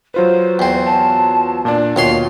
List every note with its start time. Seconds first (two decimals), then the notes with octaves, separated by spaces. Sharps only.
0.14 F#3 F4 B4 C5
0.59 E2 C4
0.85 A5
1.65 A#2 D4 D5
1.96 D#2 B2 F4 C#5 C6